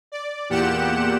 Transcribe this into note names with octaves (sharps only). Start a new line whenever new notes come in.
D5
E2 A#2 G4 F#5 C#7 E7